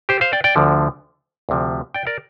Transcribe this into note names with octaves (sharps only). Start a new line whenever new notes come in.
G4 C5
C5 F5
D5 G5
D5 G5
D2 D3 F3
D2 C3 F3
D5 G5
A#4 D5